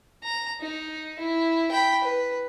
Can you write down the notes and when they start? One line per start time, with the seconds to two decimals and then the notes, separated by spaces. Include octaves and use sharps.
0.23 A#5
0.60 D#4
1.19 E4
1.71 G5 B5
2.03 B4